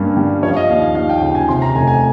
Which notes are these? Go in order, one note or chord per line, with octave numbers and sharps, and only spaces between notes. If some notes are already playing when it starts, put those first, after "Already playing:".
Already playing: G2 A#3 C#4
G3
F3 C#5
F5
D#5
D#2 F5
F5
D#2 F5
G5
C#3 G5
G#5
C3 C6
A#5
F1 G#5
G#5